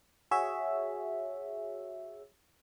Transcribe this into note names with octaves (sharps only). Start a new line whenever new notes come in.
F#4 G#4 C#5 E5